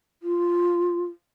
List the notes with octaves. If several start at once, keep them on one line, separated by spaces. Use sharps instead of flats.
F4